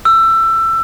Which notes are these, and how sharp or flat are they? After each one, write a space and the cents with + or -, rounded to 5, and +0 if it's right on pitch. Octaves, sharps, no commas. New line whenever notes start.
E6 +20